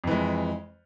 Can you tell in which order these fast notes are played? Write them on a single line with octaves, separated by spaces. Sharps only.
F2 E3 G#3